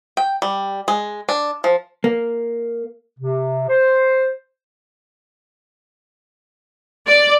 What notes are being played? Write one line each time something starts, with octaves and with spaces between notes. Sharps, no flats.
G5
G3
G#3
D4
F3
A#3
C3
C5
D5